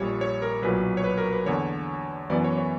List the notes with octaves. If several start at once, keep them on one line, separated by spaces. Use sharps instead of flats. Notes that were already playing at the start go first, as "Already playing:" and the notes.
Already playing: A#1 A#2 G3 C#5
C#5
A#4
B1 A#2 F#3 B4
C#5
B4
A#4
B4
E2 D3 A#3 C#5
F#2 E3 B3 D5
C#5
C#5